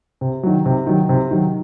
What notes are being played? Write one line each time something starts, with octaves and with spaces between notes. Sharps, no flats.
C3
D#3 F#3
C3
D#3 F#3
C3
D#3 F#3